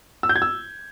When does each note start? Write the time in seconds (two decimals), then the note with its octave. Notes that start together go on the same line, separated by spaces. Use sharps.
0.23 E6
0.29 G6
0.36 G#6
0.42 E6